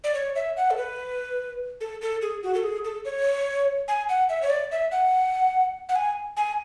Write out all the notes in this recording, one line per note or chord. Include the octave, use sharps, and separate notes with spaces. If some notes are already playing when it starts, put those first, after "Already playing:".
D5
C#5
E5
F#5
A4
B4
A4
A4
G#4
F#4
A4
G#4
A4
C#5
G#5
F#5
E5
C#5
D5
E5
F#5
F#5
G#5
G#5